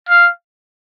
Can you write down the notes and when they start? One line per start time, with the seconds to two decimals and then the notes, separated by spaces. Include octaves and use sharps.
0.09 F5